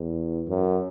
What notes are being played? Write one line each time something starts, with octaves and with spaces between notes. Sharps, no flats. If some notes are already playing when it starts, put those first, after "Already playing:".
Already playing: E2
F#2